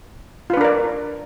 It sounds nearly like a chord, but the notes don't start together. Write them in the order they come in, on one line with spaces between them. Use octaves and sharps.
F4 B4 D4 A#4 D5